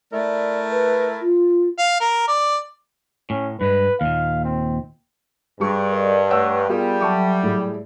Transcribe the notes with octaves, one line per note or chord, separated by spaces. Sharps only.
A3 E4 A#4 D5
B4
F4
F5
A#4
D5
A2 C#4
G2 G#3 B4
D#2 A#2 F5
C4
G2 G3 G#4 C#6
A#4 D5 D#5
A3 B4 C#5 F#5 C#6 E6
G3 B3 F4 G#4 A#4
F#3 A4 E5 A5 C#6 D6
A2 G#4